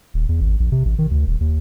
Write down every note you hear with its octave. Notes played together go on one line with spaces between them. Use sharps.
D#1
E2
G#1
A#1
C3
A1
D#3
D2
D#1
D#2